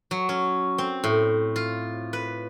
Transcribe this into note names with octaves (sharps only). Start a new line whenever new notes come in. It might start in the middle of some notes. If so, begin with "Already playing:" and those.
F#3
C#4
C4
A2
F4
B4